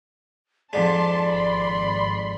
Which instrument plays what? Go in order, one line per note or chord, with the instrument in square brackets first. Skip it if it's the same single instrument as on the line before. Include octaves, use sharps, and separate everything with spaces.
[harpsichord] F2 G#2 G#3 [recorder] D5 [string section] A5 C6
[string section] G#1 B5 C6